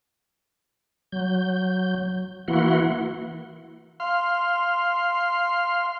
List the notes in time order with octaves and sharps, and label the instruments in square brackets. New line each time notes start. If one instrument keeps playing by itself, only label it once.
[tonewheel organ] F#3 G6
E3 A#3 E4 F#4 F#5 C6
[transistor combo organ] F5 C6